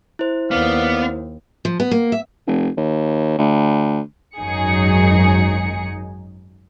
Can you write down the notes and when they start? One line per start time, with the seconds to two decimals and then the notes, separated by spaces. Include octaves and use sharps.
0.19 E4 C5
0.51 D#2 B3 D5 F5 F#5
1.65 F3
1.80 B3
1.91 A#3
2.12 E5
2.47 F1
2.78 D#2
3.38 D2
4.37 G#1 F#2 F#3 D#4 G#4 C#7